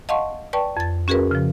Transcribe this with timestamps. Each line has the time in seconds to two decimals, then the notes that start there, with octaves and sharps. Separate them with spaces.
0.09 D#5 F5 F#5 A5 C6 C#6
0.53 B4 D5 G5 A5 C#6
0.77 F2 A6
1.08 C#4 F#4 G#4 A#4 B4
1.31 C#3 F3